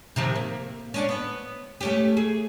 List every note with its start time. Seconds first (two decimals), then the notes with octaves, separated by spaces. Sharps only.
0.16 C3 D#3 F3
0.36 A#3
0.94 C#4 D4 D5
1.09 B3
1.81 A3 C#4 G4
2.17 G#4